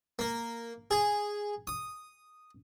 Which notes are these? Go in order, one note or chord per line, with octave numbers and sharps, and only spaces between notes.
A#3
G#4
D#6